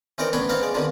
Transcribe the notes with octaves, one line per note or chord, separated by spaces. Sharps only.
E3 C4 D#4 A#4 D5 D#5
A1 B3 D4 C#5 B5 C6
B3 C4 D#4 C5 D#5 F5
G#3 D5
F2 D3 D#3 F3 B3